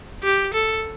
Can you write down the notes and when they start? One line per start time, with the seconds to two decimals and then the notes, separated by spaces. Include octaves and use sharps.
0.23 G4
0.54 A4